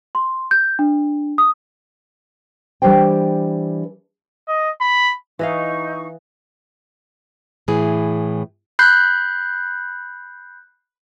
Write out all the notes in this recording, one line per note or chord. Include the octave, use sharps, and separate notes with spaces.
C6
G6
D4
D#6
E3 G3 D4 C5 G5
D#5
B5
E3 D#4 E4 D#5 F5 C#6
A2 E3 G#4
B5 F#6 G6 C7